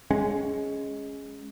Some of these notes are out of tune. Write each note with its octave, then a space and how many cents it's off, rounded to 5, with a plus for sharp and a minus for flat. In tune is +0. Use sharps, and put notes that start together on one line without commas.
G#3 +0 C#4 +0